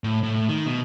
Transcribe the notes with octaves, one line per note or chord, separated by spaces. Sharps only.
A2
A2
D#3
B2